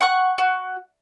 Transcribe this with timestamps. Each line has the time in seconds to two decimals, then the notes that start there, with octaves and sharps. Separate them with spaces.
0.01 F#5 C#6 F#6
0.38 F#4